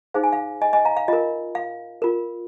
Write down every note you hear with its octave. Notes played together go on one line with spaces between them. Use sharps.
D#4 G#4 C5 F5
G#5
F5
D#5 G#5
D#5 G#5
F5 A#5
F5
F4 A#4 D#5
F5
F4 A#4